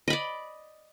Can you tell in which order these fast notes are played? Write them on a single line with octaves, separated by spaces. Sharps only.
D#5 B5 D5